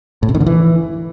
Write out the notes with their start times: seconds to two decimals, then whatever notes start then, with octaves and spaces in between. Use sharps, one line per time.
0.23 A2
0.29 C3
0.35 D#3
0.41 D3
0.46 E3